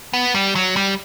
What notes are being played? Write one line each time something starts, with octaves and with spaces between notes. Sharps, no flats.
B3
G3
F#3
G3